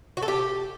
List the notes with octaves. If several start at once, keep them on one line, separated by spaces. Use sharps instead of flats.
F#4
A4
G4